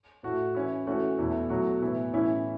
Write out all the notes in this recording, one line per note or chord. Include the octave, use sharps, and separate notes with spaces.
A2 A3 F#4
E3 C#4 E4
E3 A3 C#4 F#4
E2 B2 A3 E4
B2 F#3 A3 F#4
A2 E3 B3 E4
A2 E3 C#4 E4